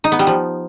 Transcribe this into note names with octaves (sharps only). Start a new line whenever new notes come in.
D#4
B3
G3
F3